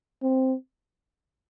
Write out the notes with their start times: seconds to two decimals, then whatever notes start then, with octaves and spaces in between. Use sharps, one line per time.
0.22 C4